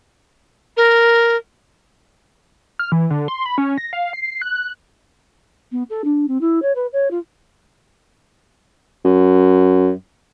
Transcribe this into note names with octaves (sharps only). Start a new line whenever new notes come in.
A#4
F6
E3
D3
C6
B5
C#4
A#6
F5
C7
F#6
F#6
B3
A4
D4
C4
E4
C#5
B4
C#5
F4
F#2